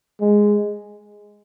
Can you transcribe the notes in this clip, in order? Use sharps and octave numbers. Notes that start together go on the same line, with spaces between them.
G#3